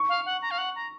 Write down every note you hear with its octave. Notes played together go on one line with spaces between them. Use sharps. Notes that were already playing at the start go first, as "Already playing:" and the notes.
Already playing: C#6
F5
F#5
A#5
F5
F#5
A#5